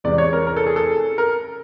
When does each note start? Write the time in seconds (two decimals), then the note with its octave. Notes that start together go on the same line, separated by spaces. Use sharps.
0.04 E2 C3 E3 G#3 D5
0.18 C#5
0.33 A#4
0.47 A#4
0.57 A4
0.66 G#4
0.76 A4
1.18 A#4